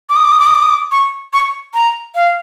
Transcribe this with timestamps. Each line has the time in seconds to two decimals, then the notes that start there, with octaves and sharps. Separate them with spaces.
0.09 D6
0.16 D#6
0.25 D6
0.32 D#6
0.40 D6
0.46 D#6
0.55 D6
0.62 D#6
0.70 D6
0.91 C#6
1.33 C#6
1.74 A#5
2.15 F5